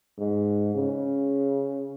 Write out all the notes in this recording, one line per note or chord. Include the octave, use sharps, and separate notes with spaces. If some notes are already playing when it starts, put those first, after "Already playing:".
G#2
C#3